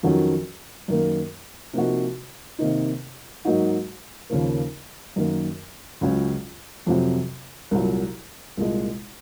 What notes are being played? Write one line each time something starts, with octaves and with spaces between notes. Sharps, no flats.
F2 D#3 F#3 C#4 F#4
F#2 D#3 A#3
C3 F3 A#3 D#4 F#4
C3 D#3 A#3 D#4
G#2 F#3 A#3 D#4 F#4
D#2 C#3 F3 A#3
F#2 D#3 A#3
C#2 C#3 F#3 C#4 F4
F2 C3 F#3
C2 A#2 F#3
C2 A#2 G#3